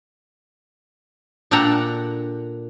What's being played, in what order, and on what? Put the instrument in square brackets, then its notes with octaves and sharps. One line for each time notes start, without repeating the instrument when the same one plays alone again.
[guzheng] A#2 D4 A4 F#5 G5 A#5